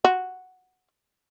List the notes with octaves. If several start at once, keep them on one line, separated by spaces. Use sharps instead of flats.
F#4